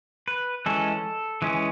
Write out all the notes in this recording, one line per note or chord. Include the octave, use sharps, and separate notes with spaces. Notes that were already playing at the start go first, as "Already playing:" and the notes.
B4
E3 G#3 C#4 A4
E3 G#3 C#4